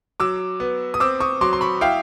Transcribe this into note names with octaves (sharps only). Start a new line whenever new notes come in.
F#3 D6 E6
B3
D#6
C4 D6 E6
C#6 D#6
F#3 C6 D6
C6
B5 C#6
E4 F5 G5